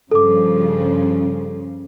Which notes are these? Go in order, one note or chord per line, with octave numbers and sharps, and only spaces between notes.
G2 C#3 F3 A4 D6